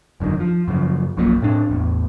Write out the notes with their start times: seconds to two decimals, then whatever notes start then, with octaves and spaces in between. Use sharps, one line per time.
0.20 F1 F#2 D3 D#3
0.40 F3
0.68 F#2 C#3 F3
1.17 D#1 A#1 F#2 A#2
1.42 A2 C4 D4
1.69 A1 E2